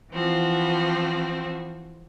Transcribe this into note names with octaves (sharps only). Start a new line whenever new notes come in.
E3 F3 C4 F#4